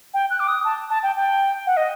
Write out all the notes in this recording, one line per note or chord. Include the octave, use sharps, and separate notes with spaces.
G5
F#6
D6
D#6
A5
A5
G5
G5
F#5
D#5